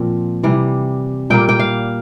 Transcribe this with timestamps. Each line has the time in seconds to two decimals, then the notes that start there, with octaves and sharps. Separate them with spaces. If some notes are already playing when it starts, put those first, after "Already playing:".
Already playing: A#2 F3 C4
0.43 C3 E3 G3
1.30 A#2 G3 A#3 G5
1.49 G5
1.59 F5